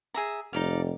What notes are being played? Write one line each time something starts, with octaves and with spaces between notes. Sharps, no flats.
G#4 E5 A#5
F1 D#4 D5 F5